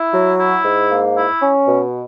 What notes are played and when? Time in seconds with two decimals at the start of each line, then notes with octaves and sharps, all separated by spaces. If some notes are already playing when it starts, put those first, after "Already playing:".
Already playing: E4
0.13 F#3
0.39 E4
0.65 G#2
0.91 A#3
1.17 E4
1.42 C#4
1.68 B2